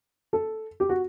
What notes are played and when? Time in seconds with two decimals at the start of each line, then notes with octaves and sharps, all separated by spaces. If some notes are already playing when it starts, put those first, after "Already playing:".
0.33 A4
0.80 G4
0.89 F#4